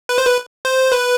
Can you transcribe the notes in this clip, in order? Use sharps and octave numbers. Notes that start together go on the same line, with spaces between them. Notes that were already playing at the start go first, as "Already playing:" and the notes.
B4
C5
B4
C5
B4